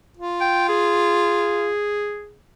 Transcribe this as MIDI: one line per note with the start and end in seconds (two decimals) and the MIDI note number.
0.17 1.71 65
0.41 0.67 79
0.69 2.34 68